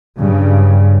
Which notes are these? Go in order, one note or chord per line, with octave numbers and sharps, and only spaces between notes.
G2 C#3